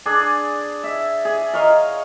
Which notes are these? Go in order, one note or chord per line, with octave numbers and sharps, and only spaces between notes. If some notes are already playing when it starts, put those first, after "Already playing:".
D4 G#4 D5
E5
G#4
A#4 C#5 D#5 F5